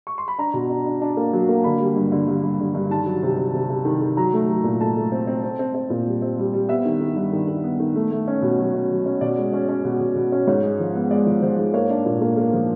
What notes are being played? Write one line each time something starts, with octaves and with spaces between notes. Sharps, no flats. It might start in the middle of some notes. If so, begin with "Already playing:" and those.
C#6
C6
B5
D4 A#5
B2
D4
D4
D4 A5
A#3
F#3
A#3
D3 B5
G3
G2
D3
G2
G2
D3
G2
D#3 A5
F#3
C3
C3
C3
C3
D#3
D#3
F#3 A#5
A3
F#3
A#2
A3 A5
A3
C4
C4
C4
C4
C4
A#2
G3
C4
G3
G3
B3 E5
D#3
D#3
G2
D#3
D#3
B3
D#3
A3
A3
C#4
B2
F#3
C#4
F#3
C#4
B2 D5
G#3
C#4
C#4
B2
B2
B2
C#4
G#2 C#5
G#3
F3
B3
G#3 D5
F3
F3 C5
G#2
A#3 C#5
D4
A#2
A#3
A#3
F3